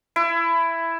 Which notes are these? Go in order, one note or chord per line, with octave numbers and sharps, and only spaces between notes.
E4